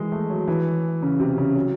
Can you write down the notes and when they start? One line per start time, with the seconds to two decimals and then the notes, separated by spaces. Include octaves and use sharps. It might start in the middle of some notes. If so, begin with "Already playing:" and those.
Already playing: D#3 E3 G#3
0.12 A3
0.30 F#3
0.48 E3
1.02 C#3
1.20 C3
1.38 C#3
1.55 F#3